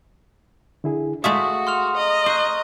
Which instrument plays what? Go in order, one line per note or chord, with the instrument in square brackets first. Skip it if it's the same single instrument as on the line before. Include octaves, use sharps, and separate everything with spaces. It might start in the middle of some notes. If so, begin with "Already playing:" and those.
[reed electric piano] D3 E4 G#4
[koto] G#3 A3 E5 [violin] F#4 [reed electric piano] F5 [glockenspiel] D#6
[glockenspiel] C6 F6 F7
[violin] D#5 A#5
[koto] C5 [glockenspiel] C#6 F#6